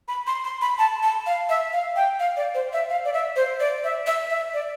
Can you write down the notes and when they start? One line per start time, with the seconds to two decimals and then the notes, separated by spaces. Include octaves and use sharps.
0.08 B5
0.27 C6
0.44 C6
0.61 B5
0.79 A5
1.03 A5
1.26 F5
1.49 E5
1.73 F5
1.96 G5
2.20 F5
2.37 D5
2.55 C5
2.73 E5
2.90 F5
3.05 D5
3.13 E5
3.36 C5
3.60 D5
3.84 E5
4.07 E5
4.30 E5
4.54 D5